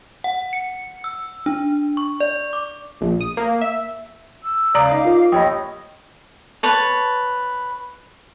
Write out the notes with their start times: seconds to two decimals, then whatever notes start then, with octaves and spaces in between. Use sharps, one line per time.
0.24 F#5
0.53 C#7
1.04 E6
1.46 D4
1.97 C#6
2.20 D5
2.53 D6
3.01 A#1
3.21 D#6
3.37 A#3
3.61 E5
4.43 E6
4.75 C#2 D5 F5 A#5 D6 D#6 D7
4.91 D#4
5.05 F4 A#4
5.32 A#1 G4 C#5 D#5 G5 B5 D#6
6.63 B4 C#5 A5